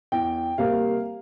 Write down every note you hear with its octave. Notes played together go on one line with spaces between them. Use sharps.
E2 G5
C3 G3 A#3 F5